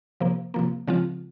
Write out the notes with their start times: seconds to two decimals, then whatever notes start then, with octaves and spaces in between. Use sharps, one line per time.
0.20 C3 F3 A#3
0.54 C3 F3 A#3
0.87 C#3 F3 G#3 C4 F4